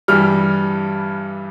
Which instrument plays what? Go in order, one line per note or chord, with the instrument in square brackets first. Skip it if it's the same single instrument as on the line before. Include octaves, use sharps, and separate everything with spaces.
[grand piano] G2 E3 G3 F6